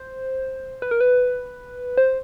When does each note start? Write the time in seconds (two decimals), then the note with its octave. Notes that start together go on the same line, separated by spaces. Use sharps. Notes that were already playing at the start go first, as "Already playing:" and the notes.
Already playing: C5
0.82 B4
0.91 A#4
1.01 B4
1.98 C5